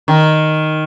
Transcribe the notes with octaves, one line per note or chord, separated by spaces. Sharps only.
D#3